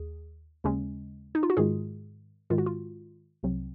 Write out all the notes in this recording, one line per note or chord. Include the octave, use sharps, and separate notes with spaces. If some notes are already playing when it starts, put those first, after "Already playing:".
Already playing: D#2 G#4
D#2 C#3 G#3 C#4
D#4
F4
F#4
G#2 D#3 G#3 F4 G#4
G#2 D#3 G#3 F4
F#4
F4
C2 C3 F#3 C4